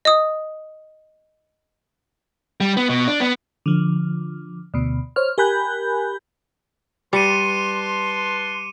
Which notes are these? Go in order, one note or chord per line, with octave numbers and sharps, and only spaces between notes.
D#5 D#6
G3
B3
B2
D4
B3
D3 F3
D2 B2
C5 C#5 F6
G4 A#4 G#5 B5 F#6 G6
G3 B4 A5 C6 D6 C#7 D#7